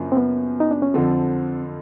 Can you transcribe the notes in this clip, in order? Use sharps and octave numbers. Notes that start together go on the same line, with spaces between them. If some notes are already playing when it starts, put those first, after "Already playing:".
Already playing: F#2 C#3 F3 A#3 D4
C4
B3
D#4
D4
C#4
F2 D3 F3 C4